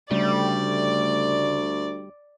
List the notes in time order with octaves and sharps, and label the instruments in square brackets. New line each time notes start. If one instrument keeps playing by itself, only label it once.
[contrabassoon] D2 [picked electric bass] C#3 A3 [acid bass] G3 [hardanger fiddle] D5